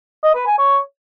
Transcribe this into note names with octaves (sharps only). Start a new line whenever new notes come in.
D#5
B4
G#5
C#5